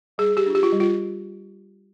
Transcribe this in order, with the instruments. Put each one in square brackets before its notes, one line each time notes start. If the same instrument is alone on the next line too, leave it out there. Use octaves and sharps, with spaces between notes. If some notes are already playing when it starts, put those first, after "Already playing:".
[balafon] G3 G#4
G4
D4 F4
G4
F4
G3
F4